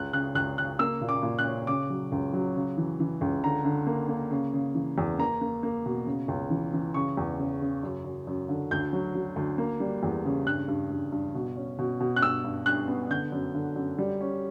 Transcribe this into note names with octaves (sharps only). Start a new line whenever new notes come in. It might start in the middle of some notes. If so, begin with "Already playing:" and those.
Already playing: C#2 F#6
C#3 F#6
C#2 F#6
C#3 F#6
A#3 E6
A#2
D6
A#2
F#6
C#4
C#3 D6
F#3
C#2
F#3
C#3
E3
E3
C#2
D3 A#5
D3
A#3
A#3
C#3
C#3
E3
E2
A#3 A#5
A#3
A#3
B2
C#3
C#2
E3
E3
C#3 C#6
E2
C#3
C#3
F#2
F#2
F#2
D3
D2 G6
F#3
F#3
D2
A#3
G3
E2
C#3
G2 F#6
G2
G2
G2
B2
C#4
B2
B2
F#6
G2 E6
G2
G2 F#6
B3
D3 G6
F#2
D3
F#2
G3
C#4